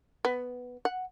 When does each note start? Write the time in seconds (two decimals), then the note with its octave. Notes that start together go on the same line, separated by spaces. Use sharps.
0.25 B3
0.85 F#5